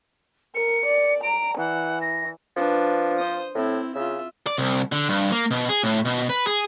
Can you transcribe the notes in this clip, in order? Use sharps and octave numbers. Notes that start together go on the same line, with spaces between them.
A#4 C#7
D5
A#5 D7
E3 F#5
A#6
F3 D4 B4
C5 D#6
A2 C4 E4
C#3 F4 E5
D5
C2
D3
G2
A#3
B2
G#4
A2
B2
B4
G#4